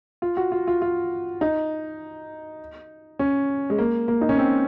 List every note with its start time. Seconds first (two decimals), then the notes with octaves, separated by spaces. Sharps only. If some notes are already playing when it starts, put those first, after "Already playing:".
0.22 F4
0.37 F#4
0.52 F4
0.67 F4
0.82 F4
1.41 D#4
3.19 C#4
3.70 G#3
3.78 A#3
4.08 A#3
4.21 D#4
4.29 C#4
4.38 C4